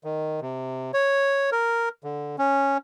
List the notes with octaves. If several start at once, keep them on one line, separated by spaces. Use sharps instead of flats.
D#3
C3
C#5
A#4
D3
C#4